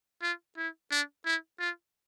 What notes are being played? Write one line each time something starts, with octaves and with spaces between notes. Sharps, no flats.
F4
E4
D4
E4
F4